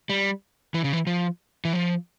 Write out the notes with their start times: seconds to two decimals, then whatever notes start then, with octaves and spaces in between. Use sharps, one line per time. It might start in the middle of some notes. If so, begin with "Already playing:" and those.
0.10 G3
0.74 E3
0.84 C#3
0.93 E3
1.07 F3
1.65 E3
1.73 F3